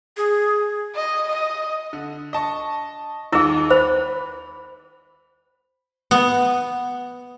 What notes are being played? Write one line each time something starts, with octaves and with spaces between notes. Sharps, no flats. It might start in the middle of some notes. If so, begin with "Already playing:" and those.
G#4
D#5
D#5
D3
D#5 A5 C#6
D#2 D#4 E4 G#4 E6
C5 B5
B3